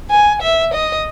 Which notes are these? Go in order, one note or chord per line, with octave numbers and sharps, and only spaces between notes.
G#5
E5
D#5